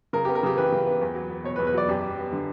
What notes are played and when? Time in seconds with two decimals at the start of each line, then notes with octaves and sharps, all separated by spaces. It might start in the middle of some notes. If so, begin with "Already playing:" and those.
0.13 C#3 A#4
0.25 B3 G4
0.35 A#4
0.43 C#3 G4
0.57 E3 B4
0.72 C#3
0.86 B3
1.01 E2
1.15 F#3
1.30 B3
1.44 B2 C#5
1.56 B4
1.59 E2
1.67 B4
1.74 F#3 D5
1.88 F#2 G4
2.04 G3
2.18 B3
2.33 D3